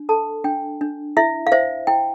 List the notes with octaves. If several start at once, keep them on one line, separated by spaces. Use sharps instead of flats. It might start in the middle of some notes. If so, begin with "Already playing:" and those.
Already playing: D4
A4 A5
D4 G5
D4
E4 E5
F5
C5 E5
E4 G5